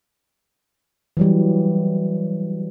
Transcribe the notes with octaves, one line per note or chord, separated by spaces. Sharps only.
E3 F#3 G3